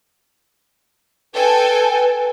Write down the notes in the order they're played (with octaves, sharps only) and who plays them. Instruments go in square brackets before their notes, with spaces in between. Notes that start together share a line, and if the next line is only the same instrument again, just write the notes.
[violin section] A4 G5 G#5 [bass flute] B4